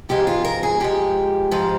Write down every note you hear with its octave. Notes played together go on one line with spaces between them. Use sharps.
G#2 F3 G#3 G4
F4
A#4
G#4
G#2 F3 G#3 G4
G#2 F3 G#3